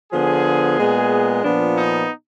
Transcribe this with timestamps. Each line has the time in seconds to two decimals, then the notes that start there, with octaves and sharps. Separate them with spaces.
0.12 D3 F3 B3 G#4
0.79 A#2 G#3 B3
1.43 A#2 F3 B3 D4
1.77 D#4